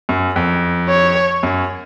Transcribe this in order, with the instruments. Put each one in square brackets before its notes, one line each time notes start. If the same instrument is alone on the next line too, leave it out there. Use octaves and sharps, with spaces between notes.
[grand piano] F#2
F2
[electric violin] C#5
[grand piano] F#2